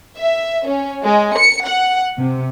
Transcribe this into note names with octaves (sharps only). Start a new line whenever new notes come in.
E5
C#4
G#3
C#7
F#5
C3